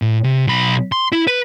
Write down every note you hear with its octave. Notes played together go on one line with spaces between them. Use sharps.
A2
C3
B1 B5
C6
E4
B4